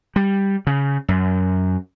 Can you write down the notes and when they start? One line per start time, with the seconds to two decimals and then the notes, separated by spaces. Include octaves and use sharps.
0.16 G3
0.67 C#3
1.08 F#2